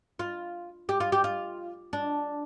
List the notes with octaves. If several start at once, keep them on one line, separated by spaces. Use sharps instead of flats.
F4
G4
F4
G4
F4
D4